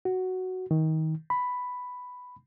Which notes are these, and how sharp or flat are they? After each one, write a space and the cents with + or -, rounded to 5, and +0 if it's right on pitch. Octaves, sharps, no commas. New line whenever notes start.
F#4 +5
D#3 +25
B5 +5